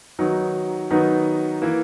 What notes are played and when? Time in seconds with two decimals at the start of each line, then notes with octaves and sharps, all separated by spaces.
0.19 D#3 F#3 B3 D#4
0.90 D#3 F#3 B3 D#4
1.62 E3 A#3